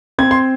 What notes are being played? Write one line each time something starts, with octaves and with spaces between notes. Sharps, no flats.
C4 G#6
C6